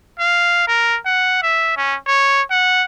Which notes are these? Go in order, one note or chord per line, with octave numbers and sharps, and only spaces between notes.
F5
A#4
F#5
E5
C#4
C#5
F#5